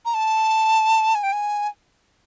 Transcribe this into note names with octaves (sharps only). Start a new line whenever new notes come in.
A#5
A5
G#5
G5
G#5